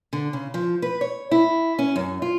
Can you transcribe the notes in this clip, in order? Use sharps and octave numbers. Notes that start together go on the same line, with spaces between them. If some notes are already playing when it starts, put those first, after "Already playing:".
D3
C#3
F3
B4
C#5
E4
C#4
F#2
F4